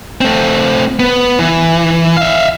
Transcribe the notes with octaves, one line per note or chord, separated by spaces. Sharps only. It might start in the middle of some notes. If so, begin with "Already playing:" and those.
A3 C4
B3
E3
E5 F5